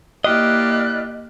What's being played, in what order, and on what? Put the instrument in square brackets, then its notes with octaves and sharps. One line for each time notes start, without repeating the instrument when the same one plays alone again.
[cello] A#3 G4 [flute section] E4 D5 F6 [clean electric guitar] D#5 [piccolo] F#6